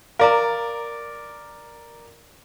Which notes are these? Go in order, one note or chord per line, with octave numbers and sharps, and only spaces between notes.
A#4 D5 F5 A#5